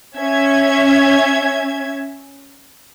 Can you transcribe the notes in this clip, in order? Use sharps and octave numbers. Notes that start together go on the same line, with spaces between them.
C#4 E5 G#6